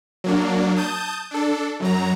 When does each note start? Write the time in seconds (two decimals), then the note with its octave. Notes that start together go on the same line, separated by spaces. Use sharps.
0.24 F#3 A#3 D4
0.76 A5 D#6 G6
1.31 D4 A4
1.80 F#2 F#3 A#5